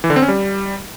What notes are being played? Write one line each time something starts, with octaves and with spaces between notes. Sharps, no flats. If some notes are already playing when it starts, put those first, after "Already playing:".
E3
D3
C4
C#4
G3